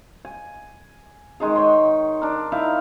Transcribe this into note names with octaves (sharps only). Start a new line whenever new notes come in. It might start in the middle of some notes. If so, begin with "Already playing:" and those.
G#5
D#3 G#3 D#4 G#4
C#5 G5 C6
D4 A#4
D#4 E4 E5 F5